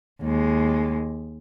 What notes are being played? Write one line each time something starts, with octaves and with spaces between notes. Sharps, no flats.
D#2 G#3